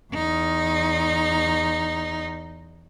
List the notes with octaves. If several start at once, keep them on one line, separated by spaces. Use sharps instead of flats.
E2 D#4